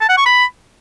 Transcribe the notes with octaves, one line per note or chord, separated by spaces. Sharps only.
A5
F#5
C#6
B5